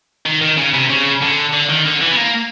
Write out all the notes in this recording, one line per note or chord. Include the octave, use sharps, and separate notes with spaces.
D#3
D#3
C#3
C3
C#3
D3
D3
D#3
D3
E3
B3
A#3